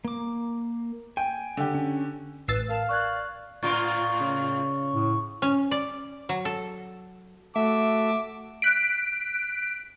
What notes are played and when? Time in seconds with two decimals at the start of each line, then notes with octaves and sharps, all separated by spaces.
0.05 A#3 D6
1.17 G5 G#5
1.57 D3 G4
1.75 C#4
2.48 A1 B4 E6 A6 C7
2.69 A#4 F5 A5
2.89 D5 C#6 F#6 G#6
3.63 A2 F4 A#4 C#6
4.20 C#3
4.94 A2
5.42 C#4
5.71 D5
6.29 F#3
6.45 A4
7.56 A3 F#4 A4 E5 D6
8.62 F#6 B6 D7